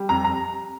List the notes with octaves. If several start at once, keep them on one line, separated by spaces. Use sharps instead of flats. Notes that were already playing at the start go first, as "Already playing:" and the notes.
Already playing: G3
F2 A#5
A#5